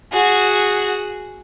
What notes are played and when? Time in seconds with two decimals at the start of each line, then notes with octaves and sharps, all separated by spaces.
0.13 F#4 G#4